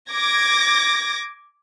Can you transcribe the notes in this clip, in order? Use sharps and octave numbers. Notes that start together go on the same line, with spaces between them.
D6 G#6 A#6